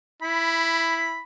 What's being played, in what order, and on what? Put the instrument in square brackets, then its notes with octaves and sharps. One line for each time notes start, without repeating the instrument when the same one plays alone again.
[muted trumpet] E4 [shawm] B5